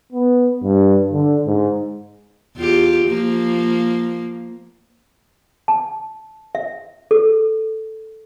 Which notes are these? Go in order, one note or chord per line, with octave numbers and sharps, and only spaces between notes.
B3
G2
D3
G#2
E2 F4 G4
F3 A#3
A5
E5
A4